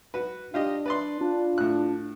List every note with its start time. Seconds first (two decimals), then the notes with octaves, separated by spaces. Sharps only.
0.14 F#4 B4
0.54 D4 F4 G4 D#5
0.86 B4 D5 C6
1.21 D4 F4
1.58 A2 F#6